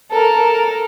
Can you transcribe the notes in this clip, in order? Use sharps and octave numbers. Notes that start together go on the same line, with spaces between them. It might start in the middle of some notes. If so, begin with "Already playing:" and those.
A4 A#4